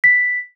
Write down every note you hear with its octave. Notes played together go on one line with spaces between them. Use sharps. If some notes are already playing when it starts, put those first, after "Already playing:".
B6